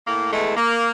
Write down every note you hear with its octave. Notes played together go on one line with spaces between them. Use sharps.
A2 A#3
E2 G#3 A3
A#3